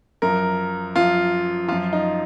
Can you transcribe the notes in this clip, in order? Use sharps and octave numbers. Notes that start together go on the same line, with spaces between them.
F#2 F3 A#4
F#2 F3 F4
F#2 F3 F4
D#4